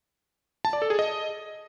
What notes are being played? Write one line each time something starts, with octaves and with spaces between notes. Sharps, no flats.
A5
D5
A4
G#4
D#5